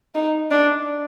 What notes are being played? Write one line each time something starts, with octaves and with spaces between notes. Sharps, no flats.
D#4
D4